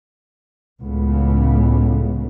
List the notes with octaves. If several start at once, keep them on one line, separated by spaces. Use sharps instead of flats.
C#2 A2 C#3 B3